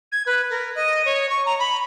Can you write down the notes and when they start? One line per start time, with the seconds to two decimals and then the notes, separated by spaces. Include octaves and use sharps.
0.12 G#6
0.26 B4
0.50 A#4
0.75 D#5
1.05 C#5
1.29 C#6
1.45 A#5
1.59 B5